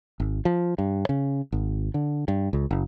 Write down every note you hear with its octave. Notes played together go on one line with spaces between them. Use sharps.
G#1
F3
G2
C#3
G#1
D3
G2
C#2
F#1